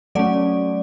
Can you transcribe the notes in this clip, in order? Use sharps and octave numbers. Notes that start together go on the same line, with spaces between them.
F#3 A3 C#4 D5